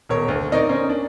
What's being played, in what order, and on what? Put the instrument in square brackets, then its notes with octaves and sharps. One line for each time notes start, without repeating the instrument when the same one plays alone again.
[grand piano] D#1 B2 A#4 C#5
D2
C4 D#4 A#4 C#5 D5
C#4 A#4 C5
D4